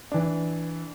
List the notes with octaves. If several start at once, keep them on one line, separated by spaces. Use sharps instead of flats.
E3 D4